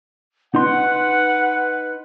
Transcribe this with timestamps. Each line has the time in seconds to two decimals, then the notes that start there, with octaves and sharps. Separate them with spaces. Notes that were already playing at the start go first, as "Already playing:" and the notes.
0.55 D#4 B4 F#5 C6